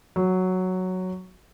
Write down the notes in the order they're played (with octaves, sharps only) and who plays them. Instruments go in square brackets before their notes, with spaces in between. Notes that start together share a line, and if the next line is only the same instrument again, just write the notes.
[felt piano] F#3